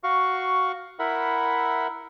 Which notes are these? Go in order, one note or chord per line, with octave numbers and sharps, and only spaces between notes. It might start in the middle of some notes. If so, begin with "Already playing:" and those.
F#4 F5 C#6
E4 A#4 E5 F#5 B5